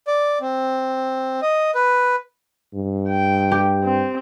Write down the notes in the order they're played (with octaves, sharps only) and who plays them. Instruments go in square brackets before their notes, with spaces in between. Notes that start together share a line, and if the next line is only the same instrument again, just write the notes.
[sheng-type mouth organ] D5
C4
D#5
B4
[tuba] G2
[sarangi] G5
[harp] G4
[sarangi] C4